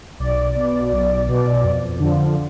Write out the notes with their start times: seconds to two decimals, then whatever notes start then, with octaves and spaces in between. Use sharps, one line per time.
0.19 B1 D5
0.56 B2
0.92 B1
1.28 B2
1.64 F2
2.00 D3 F3